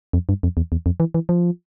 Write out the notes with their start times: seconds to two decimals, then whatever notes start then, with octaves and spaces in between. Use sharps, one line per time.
0.13 F2
0.29 G2
0.43 F2
0.57 E2
0.72 E2
0.86 F2
1.00 E3
1.14 E3
1.29 F3